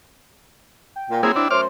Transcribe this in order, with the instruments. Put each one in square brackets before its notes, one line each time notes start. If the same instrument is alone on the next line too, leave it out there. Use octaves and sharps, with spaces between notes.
[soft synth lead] G5
[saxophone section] A#2
[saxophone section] F#3 C4 [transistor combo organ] A#3 E4 G#4
[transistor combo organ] D4 E4
[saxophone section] F#2 A3 C5 [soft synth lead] C#5 [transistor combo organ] D6 F6